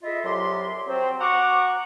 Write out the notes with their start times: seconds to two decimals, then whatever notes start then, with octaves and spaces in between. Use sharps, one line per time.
0.03 E4 F4 G#4 A4 D#5 E5
0.24 C2 F#3 G4 C6
0.86 F#3 C4
1.20 F#4 F#5 A#5 C#6 D6